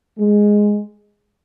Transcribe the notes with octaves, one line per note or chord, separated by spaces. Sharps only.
G#3